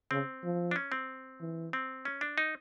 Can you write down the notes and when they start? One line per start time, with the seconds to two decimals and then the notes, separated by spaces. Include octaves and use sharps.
0.11 C#3 C4
0.44 F3
0.71 D4
0.76 C#4
0.92 C4
1.40 E3
1.73 C4
2.05 C#4
2.21 D4
2.38 D#4